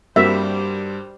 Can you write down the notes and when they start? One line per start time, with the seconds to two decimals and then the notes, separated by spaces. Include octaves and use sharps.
0.16 G2 G3 A#3 C4 F#4 C5 E5